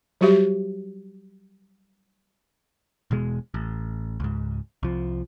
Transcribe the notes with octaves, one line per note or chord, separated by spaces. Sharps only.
F#3 G3 F#4 G4 E5
E1 B2 G#3
A1
C#2 G#2
C2 F3